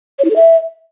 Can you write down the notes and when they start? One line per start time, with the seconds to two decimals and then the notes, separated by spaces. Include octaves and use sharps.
0.19 C#5
0.25 E4
0.30 A4
0.36 E5